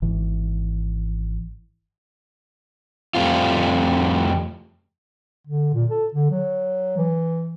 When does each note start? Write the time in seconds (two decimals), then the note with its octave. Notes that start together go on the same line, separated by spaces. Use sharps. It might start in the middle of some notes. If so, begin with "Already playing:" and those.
0.02 G#1 E3
3.15 F2 G3 A3 C4 F4
5.47 D3
5.74 A#2
5.91 A4
6.14 D3
6.31 F#3
6.98 E3